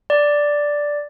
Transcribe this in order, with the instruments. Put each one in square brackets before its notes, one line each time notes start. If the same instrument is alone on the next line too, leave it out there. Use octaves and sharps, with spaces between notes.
[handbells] D5